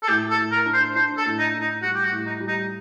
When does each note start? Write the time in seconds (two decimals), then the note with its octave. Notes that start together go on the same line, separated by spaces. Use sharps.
0.03 A4
0.08 A2 G4
0.30 A4
0.38 A2
0.52 A#4
0.66 D4
0.74 C5
0.95 D4 C5
1.17 A4
1.25 A2
1.39 D#4
1.54 A2
1.61 D#4
1.82 G3 F#4
1.95 G4
2.04 F#4
2.12 A2
2.26 D#4
2.40 G3
2.48 D#4